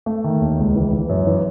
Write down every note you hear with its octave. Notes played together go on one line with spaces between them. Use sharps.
A3
D#3
D#2
C#2
E3
E3
F#2
E3